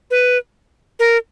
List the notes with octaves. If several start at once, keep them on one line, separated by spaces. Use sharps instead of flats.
B4
A#4